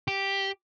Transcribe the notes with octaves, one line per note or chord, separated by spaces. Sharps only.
G4